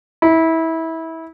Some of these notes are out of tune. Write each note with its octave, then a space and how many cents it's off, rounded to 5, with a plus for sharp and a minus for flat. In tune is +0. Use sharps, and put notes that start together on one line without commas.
E4 -25